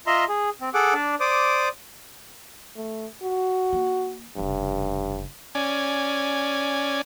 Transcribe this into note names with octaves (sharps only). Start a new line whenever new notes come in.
F4 D#5 E5 A#5 C6
G#4
C4
G#4 A4 F#5 D6
D4 D5
C5 D5 D6 D#6
A3
F#4
A#3
F1 G2 C#3
C#4 D5 G#5